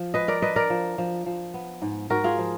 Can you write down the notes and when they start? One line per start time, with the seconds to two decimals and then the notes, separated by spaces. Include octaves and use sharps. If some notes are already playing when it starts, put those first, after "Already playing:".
Already playing: F3
0.14 G#3 B4 D#5
0.28 A#4 D5
0.42 D4 B4 D#5
0.56 A#4 D5
0.70 F3
0.98 F3
1.26 F3
1.54 B3
1.82 G#2
2.10 G#2 F#4 A#4
2.24 F4 G#4
2.38 F3